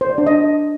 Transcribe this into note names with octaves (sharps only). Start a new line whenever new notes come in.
C5
D5
D4
D#5